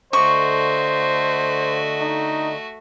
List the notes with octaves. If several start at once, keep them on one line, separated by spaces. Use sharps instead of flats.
D3 A3 F#4 C5 D#5 C#6
D#4